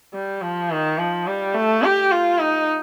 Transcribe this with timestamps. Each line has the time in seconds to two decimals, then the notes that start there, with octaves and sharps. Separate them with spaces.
0.14 G3
0.42 F3
0.71 D#3
0.98 F3
1.27 G3
1.54 A3
1.83 G4
2.11 F4
2.39 D#4